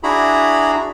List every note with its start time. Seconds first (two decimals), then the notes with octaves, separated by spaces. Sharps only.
0.03 D4 E4 F#4 G#4 A#5 B5